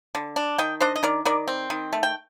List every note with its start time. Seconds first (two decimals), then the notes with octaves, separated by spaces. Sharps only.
0.15 D3
0.36 D4
0.58 D#3 D#5 G5
0.80 D4 C5 D#5
0.96 D#5
1.03 D#3 A#4 D5
1.25 D#3 A#4 D5
1.48 C4
1.70 D#3
1.93 A3
2.03 G5